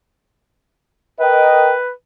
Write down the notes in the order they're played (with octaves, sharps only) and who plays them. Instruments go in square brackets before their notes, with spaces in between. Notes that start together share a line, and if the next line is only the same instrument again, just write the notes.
[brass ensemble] A#4 D#5 G5 [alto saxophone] B4